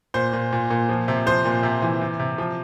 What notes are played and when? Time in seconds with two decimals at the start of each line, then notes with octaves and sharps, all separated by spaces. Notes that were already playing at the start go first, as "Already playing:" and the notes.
0.14 A#2 C5
0.33 A#2
0.52 A#2
0.70 A#2
0.89 F3
1.08 C3
1.26 F3 C5
1.45 A#2
1.63 C3
1.82 E3
2.01 C3
2.19 C3
2.38 F3